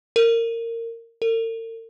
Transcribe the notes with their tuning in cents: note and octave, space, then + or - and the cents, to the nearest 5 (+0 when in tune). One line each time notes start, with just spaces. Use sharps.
A#4 -20
A#4 -45